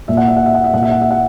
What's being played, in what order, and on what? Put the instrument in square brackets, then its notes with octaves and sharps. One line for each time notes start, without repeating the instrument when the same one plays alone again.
[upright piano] A#2 E5
F#5
E5
F#5
E5
F#5
E5
A#2 F#5
E5
F#5
E5
F#5